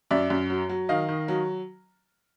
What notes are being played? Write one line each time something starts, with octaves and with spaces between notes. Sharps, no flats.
F#2 D5 E5
F#2
F#3
F#3
D#3 D#5 F5
D#3
F#3